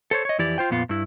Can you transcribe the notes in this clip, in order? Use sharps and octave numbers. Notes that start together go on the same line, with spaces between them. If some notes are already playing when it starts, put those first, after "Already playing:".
A4 C5 C#5
C#5 D#5
F2 E3 E4 G4 D5
F4 C5 G5
F2 A#2 B3 F4
G2 E4